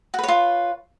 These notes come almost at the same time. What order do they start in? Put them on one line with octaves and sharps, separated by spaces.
F#4 B4 C#5 F4